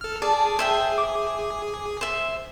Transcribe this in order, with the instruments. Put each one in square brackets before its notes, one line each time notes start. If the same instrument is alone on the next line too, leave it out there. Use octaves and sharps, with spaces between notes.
[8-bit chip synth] A4 F6
[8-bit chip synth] G#4 [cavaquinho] D5 [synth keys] A5
[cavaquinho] C5 E5 G5
[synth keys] D6
[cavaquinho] C5 E5